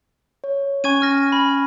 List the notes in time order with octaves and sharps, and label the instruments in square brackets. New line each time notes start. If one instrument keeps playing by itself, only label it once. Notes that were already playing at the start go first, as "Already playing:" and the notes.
[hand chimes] C#5
[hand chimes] C#4 G#5 [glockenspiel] C#6 G#6 D#7
[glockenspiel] F6 A#6
B5